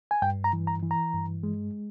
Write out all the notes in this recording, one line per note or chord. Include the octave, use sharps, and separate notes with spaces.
G#5
G2 G5
A#5
E3
A#5
E3
A#5
G2
G#3